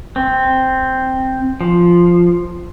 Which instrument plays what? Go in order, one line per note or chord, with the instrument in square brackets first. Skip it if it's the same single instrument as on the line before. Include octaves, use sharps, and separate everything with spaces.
[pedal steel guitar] C4
F3